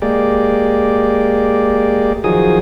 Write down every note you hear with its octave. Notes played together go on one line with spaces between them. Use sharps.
G#3 A#3 G4 D5
D#3 F3 F#3 G#4 D#6